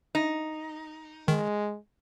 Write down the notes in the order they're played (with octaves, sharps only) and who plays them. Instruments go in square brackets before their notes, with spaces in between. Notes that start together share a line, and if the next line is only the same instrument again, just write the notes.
[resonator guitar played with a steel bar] D#4
[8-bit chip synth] D#3 [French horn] G#3